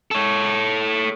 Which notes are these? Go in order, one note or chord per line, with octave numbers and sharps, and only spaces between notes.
A4 C#5